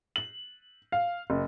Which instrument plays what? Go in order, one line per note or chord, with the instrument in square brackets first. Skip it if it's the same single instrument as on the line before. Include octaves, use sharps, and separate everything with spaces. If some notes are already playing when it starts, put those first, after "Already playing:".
[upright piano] F#7
F5
F#1